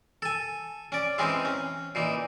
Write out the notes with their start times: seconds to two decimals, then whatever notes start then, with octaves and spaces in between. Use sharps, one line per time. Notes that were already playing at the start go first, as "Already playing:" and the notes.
0.22 A4 G#5
0.92 C#4 D5
1.18 E3 G#3 C4 C#4 D#4
1.45 C#4
1.95 A#2 E3 D#4